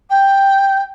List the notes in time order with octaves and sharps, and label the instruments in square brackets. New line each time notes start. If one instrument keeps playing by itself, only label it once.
[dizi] G5